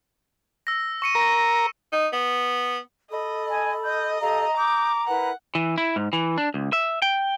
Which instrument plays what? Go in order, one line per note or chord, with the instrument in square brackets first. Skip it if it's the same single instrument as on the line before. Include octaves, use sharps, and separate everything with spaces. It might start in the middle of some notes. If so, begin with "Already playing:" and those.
[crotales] E6 A#6
C#6 C#7 D#7
[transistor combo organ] A#4
[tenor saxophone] D#4
B3
[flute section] A4 B5 [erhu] D#5
[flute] G#5
[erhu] D#5 [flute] G6
[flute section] G4 A4 F5 [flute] A#5
[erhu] D6 [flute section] D#6 G6
[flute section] E4 A#4 B4 [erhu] F#5
[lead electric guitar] E3
E4
G#2
E3
D4
C#2
E5
G5